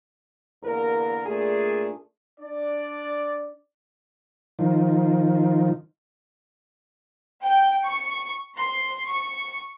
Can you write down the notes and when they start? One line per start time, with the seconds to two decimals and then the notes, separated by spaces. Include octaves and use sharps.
0.63 E2 D3 A#3 A#4
1.26 A#2 A3 D4 G#4
2.41 D4 D5
4.59 D#3 F3
7.42 G5
7.85 C#6
8.57 C6
9.07 C#6